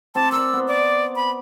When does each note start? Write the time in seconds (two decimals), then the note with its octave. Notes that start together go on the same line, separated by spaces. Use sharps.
0.15 C4 A5 D6
0.32 A#4 D5 E6
0.53 B3 C5
0.68 D5
1.16 B5